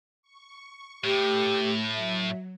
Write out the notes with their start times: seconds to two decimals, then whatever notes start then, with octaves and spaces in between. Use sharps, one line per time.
0.22 C#6
1.04 A2 A3 G4
1.93 F#3 E5